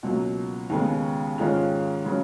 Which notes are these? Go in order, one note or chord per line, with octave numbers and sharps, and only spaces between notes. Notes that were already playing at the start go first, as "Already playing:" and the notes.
C#2 B2 F#3 A#3
D#2 C#3 G#3 B3
G#2 D#3 G#3 C#4 F4
C#3 F#3 C#4